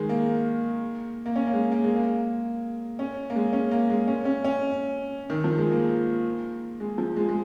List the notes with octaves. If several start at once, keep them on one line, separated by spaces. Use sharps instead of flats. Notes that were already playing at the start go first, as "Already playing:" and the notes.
Already playing: D#3 G#3
A#3
A#3
C#4
A#3
G#3
A#3
G#3
A#3
C#4
A#3
G#3
C#4
A#3
G#3
C#4
C#4
C#4
D#3
F3
G#3
A#3
G#3
F3
G#3
G#3